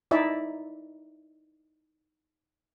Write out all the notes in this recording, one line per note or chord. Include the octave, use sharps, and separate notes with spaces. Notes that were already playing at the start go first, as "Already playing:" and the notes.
D#4 E4 D5 E5